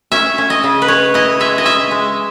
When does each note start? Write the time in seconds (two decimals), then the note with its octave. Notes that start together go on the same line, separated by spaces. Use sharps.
0.12 C#4 E5
0.38 C#4
0.50 D#5
0.63 C#3
0.82 B4
0.88 C#4 C#5
1.14 E4 D#5
1.40 G#3 E5
1.58 D#5
1.65 C#4 E5
1.91 G#3